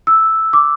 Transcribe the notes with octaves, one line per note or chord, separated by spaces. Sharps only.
E6
D6